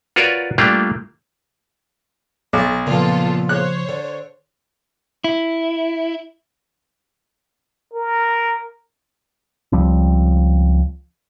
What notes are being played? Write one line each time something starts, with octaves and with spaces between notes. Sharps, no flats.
F4 F#4 A#4 B4 C#5 D5
G3 A3 A#3 D4 F4 G4
B1 A5 A#5
A#2 C#3 F3 B3 F4 A4 A5
C5 C#5 F#6
D3
E4
A#4
C#2 F3 G3 C4